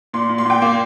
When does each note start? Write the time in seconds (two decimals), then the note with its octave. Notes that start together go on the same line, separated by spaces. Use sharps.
0.13 A#2 C6
0.29 A#2
0.38 C6
0.45 A#2 G5
0.62 A#3